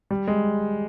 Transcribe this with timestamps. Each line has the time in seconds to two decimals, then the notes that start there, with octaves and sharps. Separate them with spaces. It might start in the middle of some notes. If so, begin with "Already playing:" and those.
0.11 G3
0.28 G#3